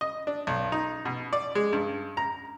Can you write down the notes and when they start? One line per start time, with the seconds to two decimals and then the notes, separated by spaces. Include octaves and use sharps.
0.01 D#5
0.27 D4
0.47 B1
0.72 D#4
1.05 B2
1.33 D5
1.55 G#3
1.73 G2
2.17 A#5